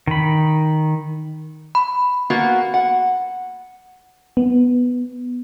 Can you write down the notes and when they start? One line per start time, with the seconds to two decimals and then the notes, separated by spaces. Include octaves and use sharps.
0.07 D#3 B5
1.75 B5
2.30 A#3 B3 F#4
2.74 F#5
4.37 B3